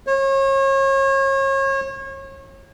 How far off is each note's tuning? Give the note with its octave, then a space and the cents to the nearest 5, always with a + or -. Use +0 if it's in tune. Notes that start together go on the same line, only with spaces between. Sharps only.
C#5 -35